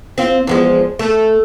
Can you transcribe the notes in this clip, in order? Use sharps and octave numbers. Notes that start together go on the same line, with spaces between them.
C4 F4
E2 F3 G#3
A3